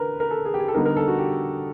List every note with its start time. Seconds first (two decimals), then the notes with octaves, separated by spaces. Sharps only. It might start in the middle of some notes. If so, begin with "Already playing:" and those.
Already playing: D3 A#4 B4
0.20 A#4
0.31 A4
0.45 G#4
0.54 G4
0.60 G#4
0.68 A4
0.74 D3 G3 B3 D#4 A#4
0.85 A#4
0.97 A4
1.08 F#4
1.18 G4